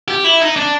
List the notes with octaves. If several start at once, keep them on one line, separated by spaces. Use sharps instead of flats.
G4
E4
D#4
D4